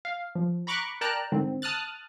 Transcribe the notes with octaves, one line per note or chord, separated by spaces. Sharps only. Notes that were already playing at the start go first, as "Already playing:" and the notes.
F5
F3
A#5 B5 C#6 D6 F#6
A#4 D5 G5 A5 A#5 F#6
G#2 D3 D#3 C4
A5 D#6 F6 F#6 A6